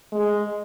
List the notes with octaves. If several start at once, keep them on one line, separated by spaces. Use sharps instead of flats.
G#3